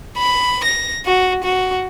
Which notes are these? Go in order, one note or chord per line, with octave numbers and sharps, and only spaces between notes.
B5
A#6
F#4
F#4